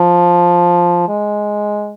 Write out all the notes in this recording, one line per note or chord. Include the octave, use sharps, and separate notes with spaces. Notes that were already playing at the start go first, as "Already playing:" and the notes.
Already playing: F3
G#3